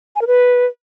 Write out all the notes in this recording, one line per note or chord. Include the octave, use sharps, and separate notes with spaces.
G#5
A#4
B4